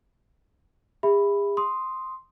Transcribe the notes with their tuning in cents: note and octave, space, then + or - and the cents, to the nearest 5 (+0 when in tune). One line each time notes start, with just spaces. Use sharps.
G#4 -45 E5 +0 B5 +0
C6 +0 D#6 +0